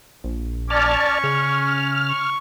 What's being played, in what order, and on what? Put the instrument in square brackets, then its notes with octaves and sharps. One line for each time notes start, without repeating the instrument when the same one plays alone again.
[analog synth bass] A#1
[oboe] C#4 [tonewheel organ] D5 A5 F6 [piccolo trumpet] C#6
[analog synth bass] C#3 [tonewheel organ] F6
[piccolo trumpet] C#6